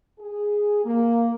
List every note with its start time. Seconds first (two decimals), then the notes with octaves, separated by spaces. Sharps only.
0.20 G#4
0.85 A#3